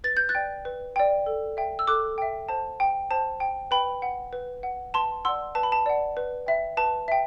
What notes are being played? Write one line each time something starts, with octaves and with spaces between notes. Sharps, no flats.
B4 A6
G6
F#6 A6
D5 G5
B4
D5 G5
A4
E5 G5
E6
A4 D6 F#6
E5 G5
C5 A5
G5
C5 A5
G5
B4 G5 B5
F#5
B4
F#5
B4 A5 C6
D5 F#5 C6 E6
B4 A5
B5
A5
D5 F#5
B4
E5 G5
B4 A5
E5 G5